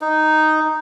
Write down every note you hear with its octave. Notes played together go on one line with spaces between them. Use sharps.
D#4